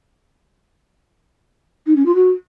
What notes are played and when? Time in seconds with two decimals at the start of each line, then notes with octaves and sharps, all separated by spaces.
1.87 D#4
1.96 C#4
2.06 F4
2.15 F#4